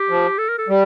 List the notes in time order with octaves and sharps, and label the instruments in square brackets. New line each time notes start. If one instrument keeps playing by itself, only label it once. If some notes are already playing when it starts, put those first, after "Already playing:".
Already playing: [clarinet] G4
[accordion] F3
[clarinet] A4
A#4
A4
[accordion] G3